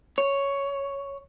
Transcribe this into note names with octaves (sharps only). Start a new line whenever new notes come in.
C#5